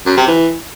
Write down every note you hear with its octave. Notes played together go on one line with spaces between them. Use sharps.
F#2
C3
E3